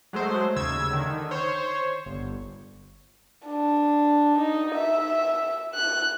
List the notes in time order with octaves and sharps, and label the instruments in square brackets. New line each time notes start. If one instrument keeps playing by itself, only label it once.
[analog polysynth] F#3 G#3 A3 C5
D#2 C#3 E6 G#6
D3 D#3
C5 C#5
G1
[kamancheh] D4
D#4
E5
F#6